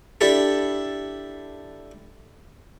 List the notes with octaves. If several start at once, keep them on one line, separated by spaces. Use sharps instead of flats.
D4 E4 G4 A4